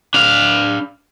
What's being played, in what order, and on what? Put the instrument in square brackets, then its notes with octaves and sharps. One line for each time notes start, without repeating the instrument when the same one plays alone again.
[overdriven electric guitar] D4 F5